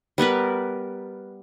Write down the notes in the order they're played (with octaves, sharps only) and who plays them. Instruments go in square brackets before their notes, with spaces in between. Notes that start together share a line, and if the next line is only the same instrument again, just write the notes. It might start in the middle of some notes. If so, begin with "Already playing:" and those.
[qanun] G3 B3 A#4 B4